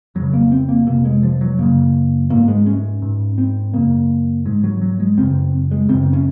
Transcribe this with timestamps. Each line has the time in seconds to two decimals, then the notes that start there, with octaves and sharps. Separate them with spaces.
0.15 F2 C#3 F#3
0.34 A#3
0.52 C4
0.69 A#3
0.87 F2 C3 A#3
1.05 G#3
1.23 F3
1.41 F#3
1.58 F#2 C#3 A#3
2.30 G#2 A#3
2.48 G#3
2.66 C#4
3.02 G#2
3.38 C4
3.73 F#2 C#3 A#3
4.45 G#2 G#3
4.64 F#3
4.82 F#3
5.00 G#3
5.18 F#2 C#3 C4
5.71 G#3
5.89 F#2 C#3 C4
6.13 C#4